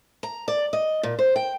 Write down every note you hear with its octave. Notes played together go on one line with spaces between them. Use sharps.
A#5
D5
D#5
A#2
C5
G5